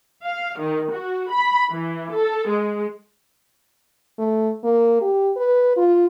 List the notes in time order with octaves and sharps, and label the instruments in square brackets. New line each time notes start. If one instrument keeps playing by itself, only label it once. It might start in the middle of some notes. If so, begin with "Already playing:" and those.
[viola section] F5
D#3
F#4
B5
E3
A4
G#3
[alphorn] A3
A#3
G4
B4
F4